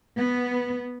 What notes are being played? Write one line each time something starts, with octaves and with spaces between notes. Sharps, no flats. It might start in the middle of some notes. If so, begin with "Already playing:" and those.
B3